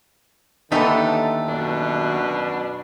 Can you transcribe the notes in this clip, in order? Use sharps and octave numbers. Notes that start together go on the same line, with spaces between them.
D#2 D3 E3 A3 B3 D#4 A4
F#2 B2 D4